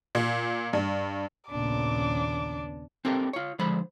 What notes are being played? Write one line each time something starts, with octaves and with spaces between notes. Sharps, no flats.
A#2
G2
A#1 D#2 A#2 C#3 B3 D4 D6
C4 D4 G4 A4 A#4
F4 C#5
D3 F3 G#3 C5 B5